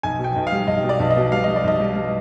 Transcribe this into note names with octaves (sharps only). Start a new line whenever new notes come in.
B1 G#5
B2
G5
B1
F5
G3
B1 D#5
B2
D5
B1
D#5
B2
G3 F5
G3 D#5
D5
B1 D#5
G3
G3